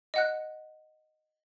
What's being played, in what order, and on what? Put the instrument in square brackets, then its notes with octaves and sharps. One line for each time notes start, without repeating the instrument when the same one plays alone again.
[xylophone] D#5 F#5 F#6